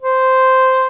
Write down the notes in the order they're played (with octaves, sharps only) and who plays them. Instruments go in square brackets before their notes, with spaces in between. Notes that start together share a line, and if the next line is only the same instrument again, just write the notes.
[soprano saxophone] C5